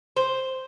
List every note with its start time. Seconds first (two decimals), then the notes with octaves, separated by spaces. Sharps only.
0.17 C5